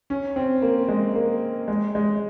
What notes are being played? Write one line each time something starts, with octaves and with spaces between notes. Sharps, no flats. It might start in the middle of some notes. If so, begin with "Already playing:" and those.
C#4
C4
A#3
G#3
A#3
G#3
G#3